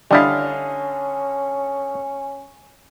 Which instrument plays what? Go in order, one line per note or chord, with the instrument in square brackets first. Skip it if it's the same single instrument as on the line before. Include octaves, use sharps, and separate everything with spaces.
[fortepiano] D3 D#5 F5 [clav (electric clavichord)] G3 D4 E4 [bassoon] C#4